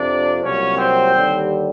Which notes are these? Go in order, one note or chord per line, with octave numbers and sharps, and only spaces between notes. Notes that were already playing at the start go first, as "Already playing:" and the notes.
Already playing: F2 C3 F3 D4 D5
C2 A#2 F#3 C#4 C#5
C4 C5
D#2 D3 G3